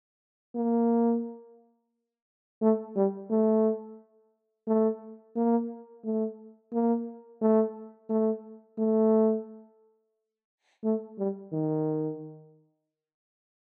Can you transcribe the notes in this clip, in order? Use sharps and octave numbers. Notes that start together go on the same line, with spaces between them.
A#3
A3
G3
A3
A3
A#3
A3
A#3
A3
A3
A3
A3
G3
D#3